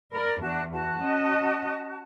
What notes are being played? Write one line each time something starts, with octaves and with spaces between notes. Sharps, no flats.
A#4 D5 B5
E2 D4 F#4 A5
F#4 A5
C#4 D#5